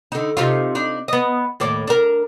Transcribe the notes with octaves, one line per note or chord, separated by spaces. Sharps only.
D3 D#4
C3 D#4 F4
D4 D#4
B3 D#5
D#2 A2 D5
D4 A#4